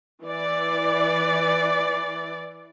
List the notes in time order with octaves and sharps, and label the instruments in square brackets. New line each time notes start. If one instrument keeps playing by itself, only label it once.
[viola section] E3 D5